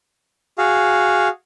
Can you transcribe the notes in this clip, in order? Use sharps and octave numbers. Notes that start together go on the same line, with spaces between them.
F#4 G#4 F5